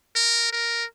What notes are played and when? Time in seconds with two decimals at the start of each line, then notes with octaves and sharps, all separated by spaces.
0.16 A#4
0.52 A#4